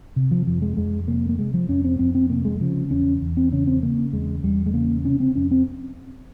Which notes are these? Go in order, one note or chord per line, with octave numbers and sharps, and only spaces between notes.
C3
F3
F2 F3
G#3
F2 G#3
C3 A#3
A#3
C3 G#3
F3
F2 C#4
C4
F2 C4
C4
C3 A#3
G#3
C#3 F3
E2 C#4
E2
C4
C#3 C#4
C4
C#3 A#3
E2 G#3
E2 G3
G#3
C#3 A#3
C3 C#4
C4
F2 C#4
C4